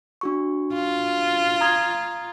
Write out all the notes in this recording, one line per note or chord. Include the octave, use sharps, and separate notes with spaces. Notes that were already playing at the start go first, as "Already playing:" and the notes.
D4 F#4 C#6
F4
A#5 D#6 G#6